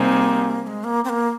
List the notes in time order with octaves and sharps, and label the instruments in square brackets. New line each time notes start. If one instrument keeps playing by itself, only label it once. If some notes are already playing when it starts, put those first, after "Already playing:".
Already playing: [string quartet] C3 G3 C4 D#4 G#4 [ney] A#3
[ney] A#3
G#3
A#3
C4
A#3